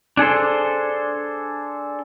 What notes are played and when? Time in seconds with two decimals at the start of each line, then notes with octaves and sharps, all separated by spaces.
0.17 D4 G#4 A4 C5